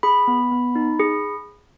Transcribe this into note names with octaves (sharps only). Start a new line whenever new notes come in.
G#4 B5
B3
B3
D#4
G#4